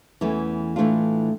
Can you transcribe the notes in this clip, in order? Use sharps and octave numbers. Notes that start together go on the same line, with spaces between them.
E2 E3 A3 C#4
A2 E3 A3 D4 F4